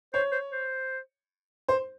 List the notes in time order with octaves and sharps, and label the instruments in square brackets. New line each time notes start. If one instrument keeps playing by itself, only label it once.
[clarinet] C5 [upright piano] C#5
[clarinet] C5
C5
[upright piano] C5